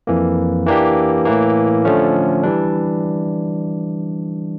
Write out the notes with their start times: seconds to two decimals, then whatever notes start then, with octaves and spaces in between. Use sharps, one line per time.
0.07 F2 E3 A#3
0.66 E3 A#3 D4 G4
1.26 A2 E3 A#3
1.85 D3 F3 A3 C#4
2.43 E3 G3 D4